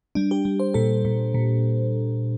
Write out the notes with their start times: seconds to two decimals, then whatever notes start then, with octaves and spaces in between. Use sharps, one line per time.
0.15 G3 D4
0.31 G4
0.45 G3
0.60 C5
0.74 A#2 A4
1.05 A#2
1.34 A#2